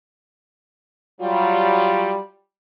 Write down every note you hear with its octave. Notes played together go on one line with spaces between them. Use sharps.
F#3 G3 F4